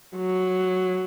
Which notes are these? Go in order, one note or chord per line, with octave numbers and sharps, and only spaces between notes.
F#3